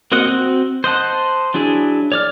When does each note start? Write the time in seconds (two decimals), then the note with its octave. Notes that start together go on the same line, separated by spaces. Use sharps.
0.12 A#3 C4 F#4 D#5 F#5
0.26 C4 F#4
0.84 C5 D#5 F#5 A5
1.54 F#3 D4 E4 G#4
2.12 C#5 D5 F6